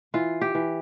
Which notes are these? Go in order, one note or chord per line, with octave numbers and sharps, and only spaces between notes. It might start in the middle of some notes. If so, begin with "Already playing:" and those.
E3 F4
G4
E3